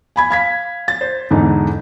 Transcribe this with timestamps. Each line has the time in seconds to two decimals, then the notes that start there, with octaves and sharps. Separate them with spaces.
0.16 G#5 B5 G#6
0.30 F5 G#6 B6
0.88 A6
1.01 C5
1.31 E2 G#2 D3 E3 D#4